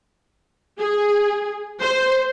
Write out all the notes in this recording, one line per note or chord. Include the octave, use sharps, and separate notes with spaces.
G#4
C5